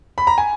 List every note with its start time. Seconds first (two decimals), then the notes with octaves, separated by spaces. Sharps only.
0.18 B5
0.27 A#5
0.38 G#5